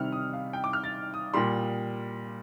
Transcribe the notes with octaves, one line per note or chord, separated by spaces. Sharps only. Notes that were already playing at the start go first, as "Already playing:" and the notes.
Already playing: C3 D#3 G3 F6
D#6
F5
G5
D6
F6
A6
D#6
A#2 G3 C6